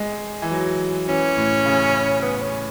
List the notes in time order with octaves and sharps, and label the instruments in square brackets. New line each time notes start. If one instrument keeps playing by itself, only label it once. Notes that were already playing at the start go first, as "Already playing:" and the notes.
Already playing: [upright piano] G#3
E3
F#3
[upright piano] E3 [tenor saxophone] C#4
[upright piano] A2
C#3
[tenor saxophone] B3
C#4